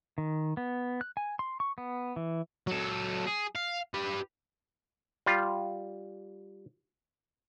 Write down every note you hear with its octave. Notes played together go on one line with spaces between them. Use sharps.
D#3
B3
F#6
G#5
C6
C#6
B3
E3
F#3 A4
G#4
F5
G4 B4
G3 F4